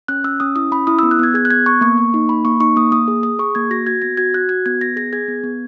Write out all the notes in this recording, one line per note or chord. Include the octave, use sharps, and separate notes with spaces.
C#4 F#6
C#4 E6
C#4 D#6
E4 D#6
C#4 B5
E4 D#6
B3 E6
F#6
B3 G#6
G#4 G#6
F#6
B3 G#6
B3 C#6
A#3 C#6
A#3
D#4
A#3 B5
A#3 C#6
D#4 C#6
A#3 D#6
A#3 D#6
G#4
G#4 D#6
G#4 C#6
A#3 G#6
F#4 A#6
F#4 G#6
B3 A#6
F#4 G#6
F#4 F#6
F#4 G#6
B3 G#6
B3 A#6
G#4 A#6
G#4 G#6
B3
B3